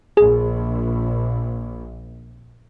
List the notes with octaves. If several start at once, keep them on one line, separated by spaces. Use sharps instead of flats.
A#1 G#4